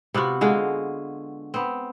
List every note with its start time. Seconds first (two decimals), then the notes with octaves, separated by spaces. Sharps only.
0.14 C3 B3 F4 F#4
0.41 D3 G#3 F4 F#4
1.54 B3 C4